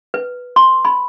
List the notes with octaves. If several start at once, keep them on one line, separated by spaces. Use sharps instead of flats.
B4
C6
B5